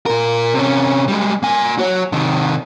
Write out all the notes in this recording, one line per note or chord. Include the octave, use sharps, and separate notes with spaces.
A#2 A#4
C3 C#4
G3 G#3
A#3 G#5
F#4 C#5
C3 D#3